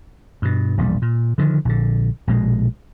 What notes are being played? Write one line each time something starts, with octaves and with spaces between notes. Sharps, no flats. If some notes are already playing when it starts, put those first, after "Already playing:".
G2 B2
E1 A#1 C3 G3
A#2
D3 D#3 F3
A#1 D3
A#1 B2 G#3